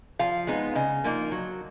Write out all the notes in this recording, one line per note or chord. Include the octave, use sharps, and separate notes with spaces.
F3 F5
G#3 B3 D#4
C#3 D#5
F3 A#3 D#4
F#3